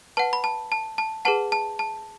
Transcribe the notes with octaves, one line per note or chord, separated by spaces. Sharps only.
B4 F#5 A5
B5
A5
A5
A5
G#4 B4 F#5 A5
A5
A5